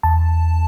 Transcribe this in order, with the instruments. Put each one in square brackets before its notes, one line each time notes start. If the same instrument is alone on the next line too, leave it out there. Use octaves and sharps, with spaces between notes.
[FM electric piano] E2 A5